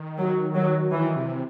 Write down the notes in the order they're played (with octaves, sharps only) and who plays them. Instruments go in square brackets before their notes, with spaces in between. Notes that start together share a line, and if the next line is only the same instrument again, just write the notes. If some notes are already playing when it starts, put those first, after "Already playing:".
Already playing: [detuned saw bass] D#3
[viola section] F#3
F#3
[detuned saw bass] D#3 [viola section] E3
[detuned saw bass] C3